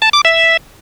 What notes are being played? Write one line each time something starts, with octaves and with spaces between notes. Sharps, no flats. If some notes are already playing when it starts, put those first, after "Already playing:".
A5
D6
E5